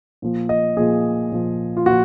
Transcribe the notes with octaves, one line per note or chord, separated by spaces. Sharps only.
A#2 F3
D#5
A#2 F3 G#4
A#2 F3
F4
A#2 F3 F#4